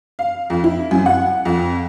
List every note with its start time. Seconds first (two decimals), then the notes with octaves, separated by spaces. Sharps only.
0.19 F5
0.50 F2
0.64 E4
0.91 F#2
1.06 F#5
1.45 F2